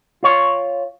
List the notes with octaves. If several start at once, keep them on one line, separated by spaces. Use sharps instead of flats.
F4 C#5